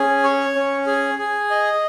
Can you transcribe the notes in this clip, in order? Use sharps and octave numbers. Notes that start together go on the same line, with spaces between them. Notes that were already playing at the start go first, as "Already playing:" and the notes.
Already playing: C#4 G#4
C#5
C#4
G#4
G#4
D#5